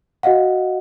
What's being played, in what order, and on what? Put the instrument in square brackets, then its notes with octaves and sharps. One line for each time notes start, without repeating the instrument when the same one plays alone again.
[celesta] F#4 D#5 F5 F#5